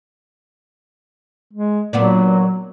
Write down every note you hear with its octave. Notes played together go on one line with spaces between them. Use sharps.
G#3
A#2 F#3 B3 D4